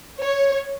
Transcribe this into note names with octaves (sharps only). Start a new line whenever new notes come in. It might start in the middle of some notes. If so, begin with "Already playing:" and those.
C#5